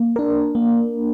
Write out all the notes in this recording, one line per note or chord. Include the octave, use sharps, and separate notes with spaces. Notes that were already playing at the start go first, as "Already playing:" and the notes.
Already playing: A#3
D4 A#4
A#3